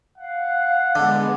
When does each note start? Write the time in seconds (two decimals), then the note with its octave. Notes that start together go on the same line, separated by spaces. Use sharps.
0.18 F5 F#5
0.95 D3 G#3 B3